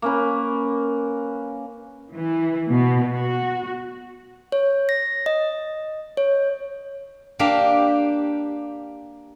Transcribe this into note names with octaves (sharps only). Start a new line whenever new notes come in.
A#3 C#4 B4
E3
B2
F#4
C#5
A#6
D#5
C#5
A#3 D4 G4 F5